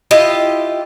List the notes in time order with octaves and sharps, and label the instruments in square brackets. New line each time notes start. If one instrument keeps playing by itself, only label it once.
[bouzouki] E4 F4 G4 D#5